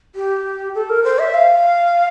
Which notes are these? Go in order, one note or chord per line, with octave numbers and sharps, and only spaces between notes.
G4
A4
A#4
C5
E5
F5